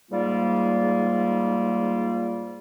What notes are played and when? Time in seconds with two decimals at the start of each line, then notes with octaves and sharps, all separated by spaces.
0.11 G#2 G3 A#3 F4